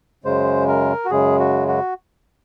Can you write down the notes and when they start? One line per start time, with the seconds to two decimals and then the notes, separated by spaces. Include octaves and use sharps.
0.24 F#2 C#3 G#3 C5
0.68 A#4
1.05 F#4
1.11 F#2 C#3 G#3 G#4
1.40 F#4
1.68 F#4